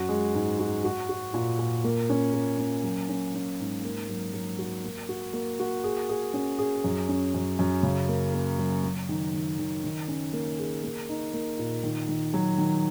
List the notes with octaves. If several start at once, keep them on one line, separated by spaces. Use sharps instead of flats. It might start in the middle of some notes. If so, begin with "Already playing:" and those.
Already playing: F#2 F#4
G#3
G#2
F#4
F#4
F#4
A#2
A#2
A#3
C#4
A#3
C#4
F#3
C#4
C#4
G#2
A#3
F#3
F#3
F#4
A#3
F#4
A#3
F#4
G#4
G#4
C#4
G#4
F#2
C#4
F#2
F#2
C#3
A#3
A#3
F#3
F#3
D#3
D#3
D#3
D#3
C#4
A#3
G#4
A#3
D#4
A#3
A#2
D#3
D#3
F#3
D#3